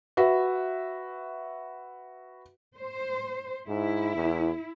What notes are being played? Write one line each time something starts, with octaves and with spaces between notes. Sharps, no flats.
F#4 B4 E5
C5
G#2 E4
E2